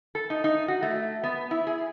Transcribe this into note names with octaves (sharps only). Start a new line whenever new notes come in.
A4
D#4
D#4
F#4
A3
B3
E4
G#4